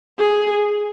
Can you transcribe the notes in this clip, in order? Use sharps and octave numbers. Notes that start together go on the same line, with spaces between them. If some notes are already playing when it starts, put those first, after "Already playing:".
G#4